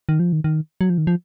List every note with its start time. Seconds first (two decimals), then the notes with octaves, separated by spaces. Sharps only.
0.09 D#3
0.20 F3
0.33 D#3
0.44 D#3
0.81 F#3
0.90 F3
0.98 D#3
1.07 F3